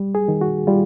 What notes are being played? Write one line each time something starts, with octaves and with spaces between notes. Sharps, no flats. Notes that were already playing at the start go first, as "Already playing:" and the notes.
Already playing: G3
G#4
D#3
F#4
G3 F4